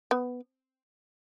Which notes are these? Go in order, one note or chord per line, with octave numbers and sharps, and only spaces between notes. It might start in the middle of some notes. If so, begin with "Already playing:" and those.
B3